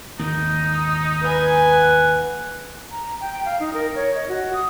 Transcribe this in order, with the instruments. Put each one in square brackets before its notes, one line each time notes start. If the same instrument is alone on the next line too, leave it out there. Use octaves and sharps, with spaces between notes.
[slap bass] D#2 G#2 D#3 [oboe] D#4
[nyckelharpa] B4 G#5
[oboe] F#5
[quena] A#5
G5
F5
D#4
A#4
C#5
D#5
F#4
D#6